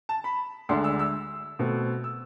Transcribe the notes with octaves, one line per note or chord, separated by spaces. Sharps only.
A5
B5
D2 D3 G#3 D4 C6
E6
E6
B2 A3 C4
E6